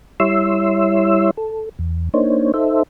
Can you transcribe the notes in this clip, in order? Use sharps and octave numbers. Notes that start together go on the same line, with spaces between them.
G3 E4 C#5 E5 C6 E6
A4
E2
A#3 D4 D#4 C5 C#5
D#4 A4 C5 E5